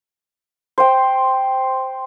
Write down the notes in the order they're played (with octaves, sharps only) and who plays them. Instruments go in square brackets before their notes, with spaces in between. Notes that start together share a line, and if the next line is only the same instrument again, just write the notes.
[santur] C5 G5